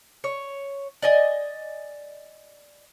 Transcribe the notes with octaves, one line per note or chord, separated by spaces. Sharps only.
C#5
D5 D#5 G#5